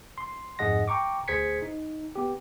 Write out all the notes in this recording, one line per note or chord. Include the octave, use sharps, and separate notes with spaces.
C6
F2 G#2 G#4 D#5 F#5 A#6
G5 A#5 C#6 D6
D2 G#4 C5 G#6 B6 C#7
D#4
B3 G4